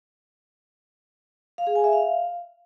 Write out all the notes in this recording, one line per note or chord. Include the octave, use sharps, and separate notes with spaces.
F5
G#4
G#5
E5
F5